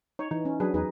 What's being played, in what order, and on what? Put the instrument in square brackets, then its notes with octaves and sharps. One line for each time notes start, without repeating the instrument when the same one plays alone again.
[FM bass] D#4 [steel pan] C#5
[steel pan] E3 [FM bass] D#4
[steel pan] C#4
[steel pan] F#3 G#4 B4 [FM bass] D4
[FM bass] E2 [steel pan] D#4 G#4 B4